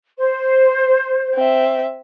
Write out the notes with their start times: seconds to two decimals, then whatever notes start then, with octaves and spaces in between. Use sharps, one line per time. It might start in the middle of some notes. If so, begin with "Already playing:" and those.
0.18 C5
1.35 C4 E5